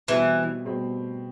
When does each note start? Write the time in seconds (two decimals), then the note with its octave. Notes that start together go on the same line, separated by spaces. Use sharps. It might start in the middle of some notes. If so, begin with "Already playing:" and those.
0.08 B2 E3 G3 C4
0.65 B2 G3 C4